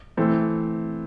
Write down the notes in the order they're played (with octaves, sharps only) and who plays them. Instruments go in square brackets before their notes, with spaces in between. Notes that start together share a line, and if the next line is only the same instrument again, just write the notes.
[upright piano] E3 A3 C4